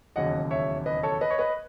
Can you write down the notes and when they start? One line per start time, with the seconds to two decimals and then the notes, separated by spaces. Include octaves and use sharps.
0.16 E1 D#2 C#3 F#3 D#5 F#5
0.51 C#5 E5
0.86 B4 D#5
1.03 A4 C#5
1.21 B4 D#5
1.30 C#5
1.38 B4 D#5